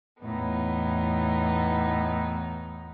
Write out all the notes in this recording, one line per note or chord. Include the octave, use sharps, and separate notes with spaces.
E2 A2 B3 D#4